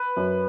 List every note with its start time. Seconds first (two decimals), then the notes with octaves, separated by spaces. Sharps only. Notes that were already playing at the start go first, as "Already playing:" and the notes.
Already playing: B4
0.17 F#2